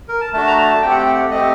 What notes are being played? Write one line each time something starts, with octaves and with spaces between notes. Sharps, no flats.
A#4
A5
A3 D4 F#4 A5
A#5
A5
A3 C4 G4 G5
F#5
G5
F#5
A3 C4 G4 D#5